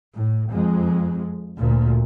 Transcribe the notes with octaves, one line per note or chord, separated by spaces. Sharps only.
A2
F2 G#3
D2 A#2